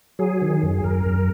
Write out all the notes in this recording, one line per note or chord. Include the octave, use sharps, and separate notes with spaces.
F#3 G#4
D#3
F#2
G#4
F#2 A#4
F#2